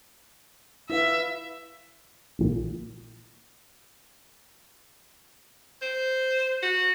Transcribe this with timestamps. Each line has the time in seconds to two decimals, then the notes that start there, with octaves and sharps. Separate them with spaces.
0.90 E4 B4 E5 F5
2.39 A#1 A#2
5.82 C5
6.63 F#4